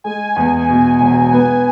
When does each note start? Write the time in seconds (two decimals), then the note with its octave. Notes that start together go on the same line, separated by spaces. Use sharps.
0.04 G#3 G#5
0.36 E2
0.69 B2
1.01 E1
1.33 B3 G#5